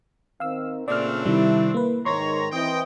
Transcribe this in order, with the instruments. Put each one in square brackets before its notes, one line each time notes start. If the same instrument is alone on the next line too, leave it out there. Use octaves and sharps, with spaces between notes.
[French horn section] D#3 C4 [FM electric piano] F5 E6
[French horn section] A#2 C#3 [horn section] A3 C4 D4 [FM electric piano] D5 F6
[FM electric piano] C3 D#3 G3 [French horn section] E4
[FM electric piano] A#3 B4
[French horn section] G#2 D#3 [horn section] C#5 A#5 [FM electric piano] C6 A#6
[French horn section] E3 C4 [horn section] D#5 G5